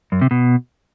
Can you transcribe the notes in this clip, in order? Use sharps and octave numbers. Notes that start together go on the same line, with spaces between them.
F#2
C3
B2